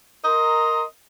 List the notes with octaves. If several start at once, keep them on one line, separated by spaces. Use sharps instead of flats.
A#4 D#5 A#5 C6